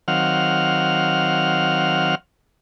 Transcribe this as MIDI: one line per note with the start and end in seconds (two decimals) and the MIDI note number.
0.08 2.15 51
0.08 2.15 54
0.08 2.15 60
0.08 2.15 77
0.08 2.15 78
0.08 2.15 89